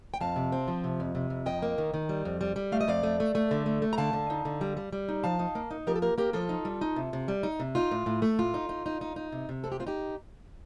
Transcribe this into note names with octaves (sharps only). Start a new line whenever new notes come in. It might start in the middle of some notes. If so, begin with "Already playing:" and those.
G5
F2 F5 A5
C3
C4
F3
C3
F2
C3
F2
F2 D#5 G5
A#3
D#3
D#3
G3
F2
G3
G3
A3 F5
D#5
F2 D5 F5
A3
A3
A3
D3
A3
A3
A#5
D3 F5 A5
D3
D#4
D3
G3
G3
G3
D#4
F3 F5 A5
D#4
A#3
D#4
F3 G4 A#4
A4
A#3 G4 A#4
A#3 G4 A#4
F3 F4 A4
D#4
G3
D#4
C3
C3
G3
D#4
C3
D#4 F4
A2
A2
A3
A2 F4
D#4
D#4
D#4
D#4
D#4
C3
C3
C4 A4
G4
C4 F4
D#4 G4